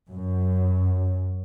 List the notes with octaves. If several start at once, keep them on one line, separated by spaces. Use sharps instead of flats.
F#2